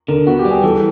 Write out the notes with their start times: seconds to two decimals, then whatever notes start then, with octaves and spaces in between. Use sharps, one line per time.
0.08 D3 A#4
0.27 B3 F#4
0.39 G4
0.45 G3
0.51 G#4
0.63 E3 A4